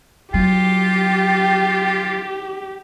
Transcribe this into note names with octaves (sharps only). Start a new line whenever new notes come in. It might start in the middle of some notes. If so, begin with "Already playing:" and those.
F#3 F4 G4 G5